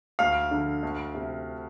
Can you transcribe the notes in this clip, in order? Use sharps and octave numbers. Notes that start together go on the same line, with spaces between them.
D2 F5
D3
D2
C3